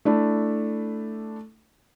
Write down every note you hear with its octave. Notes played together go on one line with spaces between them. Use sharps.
A3 D4 E4